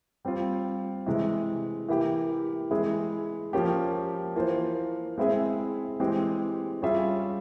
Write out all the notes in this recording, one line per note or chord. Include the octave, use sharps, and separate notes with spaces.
G3 C4 F4
C3 E3 G#3
E3 A#3 E4 G4
E3 G#3 E4 G#4
F3 A#3 C#4 G4
E3 A#3 F4 C5
G#3 C4 E4 G#4 E5
E3 G#3 C4 G4
G3 C#4 F4 G#4 E5